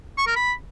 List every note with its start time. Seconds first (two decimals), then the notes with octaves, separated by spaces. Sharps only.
0.18 C#6
0.27 A#4
0.36 B5